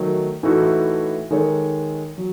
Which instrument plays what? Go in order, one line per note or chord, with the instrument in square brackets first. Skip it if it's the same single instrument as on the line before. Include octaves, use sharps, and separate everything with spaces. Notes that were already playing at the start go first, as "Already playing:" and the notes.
Already playing: [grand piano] D#3 F#3 A3 D#4
A2 E3 A3 D#4 F#4
D#3 G#3 D#4 A4 C#5
F#3